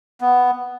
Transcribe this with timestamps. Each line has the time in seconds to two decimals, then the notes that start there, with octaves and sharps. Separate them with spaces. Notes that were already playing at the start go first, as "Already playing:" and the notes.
0.21 B3